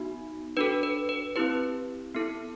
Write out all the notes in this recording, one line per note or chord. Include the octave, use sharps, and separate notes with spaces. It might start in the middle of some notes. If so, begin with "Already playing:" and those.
Already playing: B3 D#4 F#4
D4 F#4 A4 B4
B4
B4
C4 E4 G4 B4
B3 E4 A4